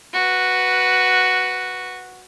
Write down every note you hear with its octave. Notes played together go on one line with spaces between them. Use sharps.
F#4 B4